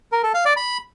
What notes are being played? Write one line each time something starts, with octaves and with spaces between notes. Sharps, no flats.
A#4
A4
F5
D5
B5